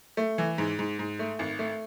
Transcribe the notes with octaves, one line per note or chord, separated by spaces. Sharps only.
A3
E3
G#2
G#2
G#2
A3
G#1
A3